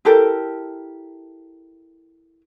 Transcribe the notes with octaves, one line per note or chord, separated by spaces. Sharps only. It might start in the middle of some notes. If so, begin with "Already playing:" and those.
E4 G4 A4 A#4